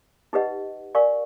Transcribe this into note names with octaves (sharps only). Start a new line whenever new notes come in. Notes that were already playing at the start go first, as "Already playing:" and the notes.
D#4 G4 B4 D#5 F#5
A#4 D5 F5 G#5 C#6